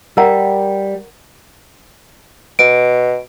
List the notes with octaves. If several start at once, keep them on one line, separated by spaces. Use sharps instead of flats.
G3 A#4 F#5 A#5
B2 D7